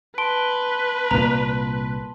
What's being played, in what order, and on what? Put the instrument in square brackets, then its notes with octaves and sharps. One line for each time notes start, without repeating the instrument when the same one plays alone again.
[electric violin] B4 [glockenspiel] A5 C6 G7 [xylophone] D7
[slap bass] C2 A#2 A#3 [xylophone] A#5